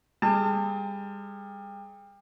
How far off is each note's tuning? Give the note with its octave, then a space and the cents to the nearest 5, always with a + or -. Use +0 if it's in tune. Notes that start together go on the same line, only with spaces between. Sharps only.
G3 +30 G#4 +25 A5 +35